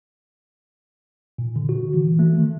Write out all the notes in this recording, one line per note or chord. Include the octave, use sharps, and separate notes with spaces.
A#2
D3
F#4
E3
A3
D#3